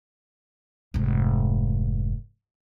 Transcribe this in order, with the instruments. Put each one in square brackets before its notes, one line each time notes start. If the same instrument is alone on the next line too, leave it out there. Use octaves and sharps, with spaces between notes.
[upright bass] F1 G#2